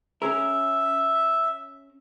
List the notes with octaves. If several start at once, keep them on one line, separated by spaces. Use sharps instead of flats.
C#4 G#4 A#4 E5